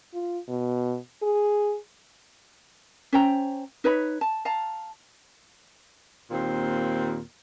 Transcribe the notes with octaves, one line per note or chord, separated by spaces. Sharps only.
F4
B2
G#4
C#4 C5 G5 A#5
D#4 B4 C#5 B5
A5
F5 A5 A#5
D#2 A#2 C4